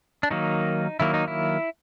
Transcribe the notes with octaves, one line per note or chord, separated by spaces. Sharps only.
D4
D#3 F#3 A#3 D#4
D#3 F#3 A#3 E4
D#4
E4